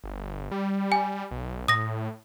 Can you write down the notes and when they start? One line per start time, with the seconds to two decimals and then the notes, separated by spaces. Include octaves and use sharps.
0.04 G1
0.51 G3
0.92 G#5
1.31 B1
1.68 A2 D#6 A#6